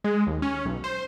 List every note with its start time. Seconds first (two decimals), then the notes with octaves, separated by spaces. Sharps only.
0.04 G#3
0.27 D#2
0.42 C#4
0.65 B1
0.84 C5